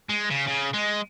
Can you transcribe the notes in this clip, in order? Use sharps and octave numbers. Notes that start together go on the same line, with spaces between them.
G#3
C#3
C#3
G#3